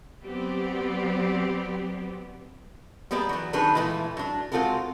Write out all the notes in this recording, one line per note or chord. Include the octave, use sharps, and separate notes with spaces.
F#3 B3 C4 G4 D5
G3 A#3 B3 G#4 D5 A#5
E3 F#3
D#3 F#3 D4 G#4 A4 B4
A#2 E3 G#3 A3 E4
F#3 D4
G#3 C4 F4 F#4 A4 A#4